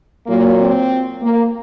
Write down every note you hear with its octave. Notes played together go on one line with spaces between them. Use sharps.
A#2 F#3 A#3
C4
A#3